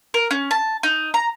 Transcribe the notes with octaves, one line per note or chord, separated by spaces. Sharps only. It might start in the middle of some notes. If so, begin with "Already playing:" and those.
A#4
C#4
A5
D#4
A#5